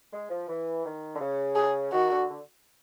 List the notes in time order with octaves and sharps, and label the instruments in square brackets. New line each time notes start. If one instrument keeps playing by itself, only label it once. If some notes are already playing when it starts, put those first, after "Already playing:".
[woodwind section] G#3
F3
E3
D#3
D3
C#3
[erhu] G#4
[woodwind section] D#3 [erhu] F#4
[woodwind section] D3
D3